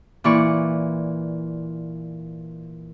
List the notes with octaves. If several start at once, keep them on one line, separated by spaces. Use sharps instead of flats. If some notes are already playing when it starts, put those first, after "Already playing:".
A#2 E3 D5 C#6